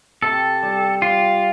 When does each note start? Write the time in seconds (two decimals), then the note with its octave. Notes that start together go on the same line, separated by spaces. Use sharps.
0.22 C3 A4
0.63 G3
1.02 G3 F4